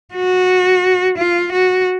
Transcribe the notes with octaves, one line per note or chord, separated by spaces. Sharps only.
F#4
F4
F#4